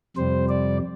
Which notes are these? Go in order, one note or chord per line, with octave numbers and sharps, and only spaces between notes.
F2 C3 G3 C5
D5